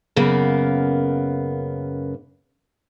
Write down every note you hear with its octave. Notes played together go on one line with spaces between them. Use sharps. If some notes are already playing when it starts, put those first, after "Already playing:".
F#2 C#3 A#3 B3